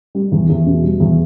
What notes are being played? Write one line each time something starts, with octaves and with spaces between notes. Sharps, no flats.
G3
E2
E2
B2
G3
E2